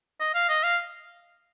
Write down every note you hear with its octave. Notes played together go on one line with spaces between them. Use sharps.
D#5
F5
D#5
F5